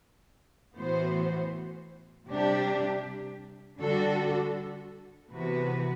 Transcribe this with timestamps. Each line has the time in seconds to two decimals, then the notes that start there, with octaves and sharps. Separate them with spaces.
0.77 A2 E3 B3 F#4 C5
2.29 C3 G3 D4 G4
3.80 D3 G3 D4 F#4 A4
5.32 C3 E3 B3 F#4 B4